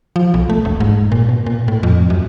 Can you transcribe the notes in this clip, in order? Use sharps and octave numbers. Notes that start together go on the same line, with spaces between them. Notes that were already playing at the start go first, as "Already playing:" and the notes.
F3
B1
A3
E1
G#2
A#2
B2
A#2
A2
F2
F#2